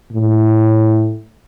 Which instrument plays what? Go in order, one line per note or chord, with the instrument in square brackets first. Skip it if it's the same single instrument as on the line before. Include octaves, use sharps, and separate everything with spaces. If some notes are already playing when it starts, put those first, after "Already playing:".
[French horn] A2